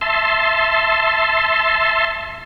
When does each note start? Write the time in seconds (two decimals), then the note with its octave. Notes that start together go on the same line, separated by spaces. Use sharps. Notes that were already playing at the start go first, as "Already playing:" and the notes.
0.01 E5 A5 C6